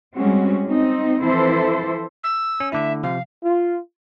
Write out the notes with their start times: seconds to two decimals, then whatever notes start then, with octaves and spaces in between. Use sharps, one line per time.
0.15 G3 G#3 C4 C#4 F#4
0.69 C4 D#4
1.23 E3 F3 C4 E4 A4 C5
2.24 E6
2.60 C#4
2.72 D3 A3 E4 E5
3.03 C3 F3 F5
3.44 F4